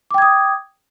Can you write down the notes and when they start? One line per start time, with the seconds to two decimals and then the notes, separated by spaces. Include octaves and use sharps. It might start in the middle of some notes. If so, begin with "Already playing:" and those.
0.11 D6
0.14 G5
0.18 G#6
0.22 D#6